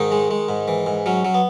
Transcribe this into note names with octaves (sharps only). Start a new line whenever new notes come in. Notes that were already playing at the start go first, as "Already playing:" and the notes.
Already playing: G#2 D#3 D#4
G#3
G#3
G#2
E3
G#2
F#3 C#4
F#3
B3